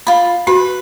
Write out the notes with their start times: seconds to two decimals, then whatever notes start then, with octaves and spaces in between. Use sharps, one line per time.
0.07 F4 B5
0.47 F#4 B4